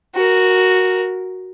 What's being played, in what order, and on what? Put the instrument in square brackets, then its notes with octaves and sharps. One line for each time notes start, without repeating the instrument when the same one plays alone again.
[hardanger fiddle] F#4 A#4